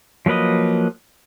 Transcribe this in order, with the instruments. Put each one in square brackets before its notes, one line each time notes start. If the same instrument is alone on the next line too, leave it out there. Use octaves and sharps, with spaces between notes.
[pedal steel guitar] F3 F#3 A#3 B4 D#5